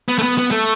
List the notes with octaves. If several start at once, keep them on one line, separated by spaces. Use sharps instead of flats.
B3
A3
B3
B3
A3